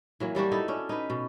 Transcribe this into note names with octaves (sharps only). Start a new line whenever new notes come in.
E3 F#3 A#3
F#3 G3 D4 F#4
D#4 E4 A4
C#4 D4
D#4 B4
B2